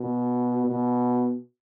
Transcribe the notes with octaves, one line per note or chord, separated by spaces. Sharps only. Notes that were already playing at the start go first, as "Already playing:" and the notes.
Already playing: B2
B2